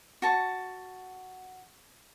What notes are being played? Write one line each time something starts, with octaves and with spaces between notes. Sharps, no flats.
F#4 A5 C#6